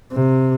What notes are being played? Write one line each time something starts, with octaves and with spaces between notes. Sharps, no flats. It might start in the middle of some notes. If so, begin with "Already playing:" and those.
C3